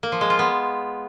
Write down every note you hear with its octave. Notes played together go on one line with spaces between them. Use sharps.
A#3
F3
G#3
F4
B3